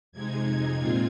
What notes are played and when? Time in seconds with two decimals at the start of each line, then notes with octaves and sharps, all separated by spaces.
0.12 F2 C3 G#3 D#4 G#6
0.77 A#2 G#3 C4 F4 G#6